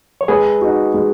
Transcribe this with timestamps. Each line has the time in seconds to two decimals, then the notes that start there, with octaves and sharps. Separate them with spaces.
0.21 C#5
0.28 G#3 G#4 B4
0.61 D#4 F#4
0.94 G#3